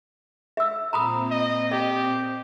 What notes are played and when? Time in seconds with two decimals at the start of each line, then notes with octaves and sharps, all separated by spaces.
0.57 E5 E6
0.93 A#2 C4 A#5 B5 D#6
1.31 D#5
1.72 G4 D#5